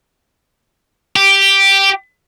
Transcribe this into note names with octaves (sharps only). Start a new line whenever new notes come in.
G4